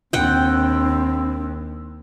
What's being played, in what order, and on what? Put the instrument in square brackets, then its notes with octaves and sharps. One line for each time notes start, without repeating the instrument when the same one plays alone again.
[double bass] D#2 [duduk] C4 [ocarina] D4 [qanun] F#5 G5